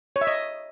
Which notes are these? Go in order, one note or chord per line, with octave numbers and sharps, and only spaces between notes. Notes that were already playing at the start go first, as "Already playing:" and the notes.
C#5
E5
D#5